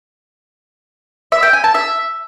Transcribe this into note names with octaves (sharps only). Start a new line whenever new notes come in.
E5
G5
G#5
A5
E5